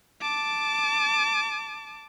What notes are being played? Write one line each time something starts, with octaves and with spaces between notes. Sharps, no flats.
A5 D6